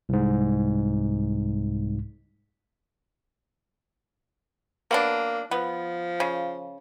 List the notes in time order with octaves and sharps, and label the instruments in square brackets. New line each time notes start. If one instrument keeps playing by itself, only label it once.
[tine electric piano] C2 G#2
[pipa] F#3 B3 D4 [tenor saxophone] A#3
[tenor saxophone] F3 [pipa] B3
[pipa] C#3